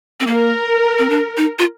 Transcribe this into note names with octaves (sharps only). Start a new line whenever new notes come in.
C4
A#3 A#4
C4
D4
D#4
F4